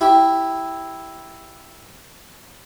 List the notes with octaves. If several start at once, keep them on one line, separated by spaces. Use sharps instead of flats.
E4 G4